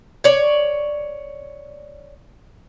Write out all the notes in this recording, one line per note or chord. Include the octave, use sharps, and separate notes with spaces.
C#5 D5